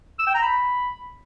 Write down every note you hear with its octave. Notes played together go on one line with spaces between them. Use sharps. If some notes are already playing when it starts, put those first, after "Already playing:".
E6
G5
A#5
B5